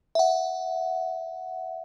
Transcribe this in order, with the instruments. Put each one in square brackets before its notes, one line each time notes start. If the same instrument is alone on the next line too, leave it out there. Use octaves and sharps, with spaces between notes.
[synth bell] E5 F#5